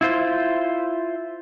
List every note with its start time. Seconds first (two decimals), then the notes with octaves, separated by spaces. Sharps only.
0.01 E4 F4 C5